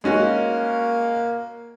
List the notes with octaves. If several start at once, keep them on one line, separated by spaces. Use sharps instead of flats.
G#3 A#3 C#4 F#4